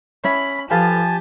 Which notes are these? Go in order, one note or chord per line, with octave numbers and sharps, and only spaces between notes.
C#4 C#5 E5 B5
F3 G4 A4 B4 F5 G#5 A5